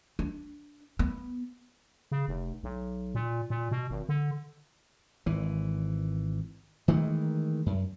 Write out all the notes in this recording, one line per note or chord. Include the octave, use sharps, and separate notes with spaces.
D4
B3
C#3
F1
B1
A#2
A#2
B2
G#1
D3
G#1 E3
D#3 E3 G#3 A3
F#2